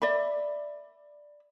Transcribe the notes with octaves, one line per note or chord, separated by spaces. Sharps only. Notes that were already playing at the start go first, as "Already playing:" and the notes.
D5 E5 B5